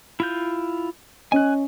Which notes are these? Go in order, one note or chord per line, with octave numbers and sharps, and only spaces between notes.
E4 F4 G6
C#4 D#5 G#5 F#6